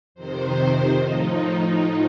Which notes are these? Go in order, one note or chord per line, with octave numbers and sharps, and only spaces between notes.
F2 C3 D#3 C5
A2 F3 D#4
A2 F3